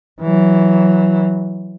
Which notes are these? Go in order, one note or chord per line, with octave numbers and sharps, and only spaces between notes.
E3 F#3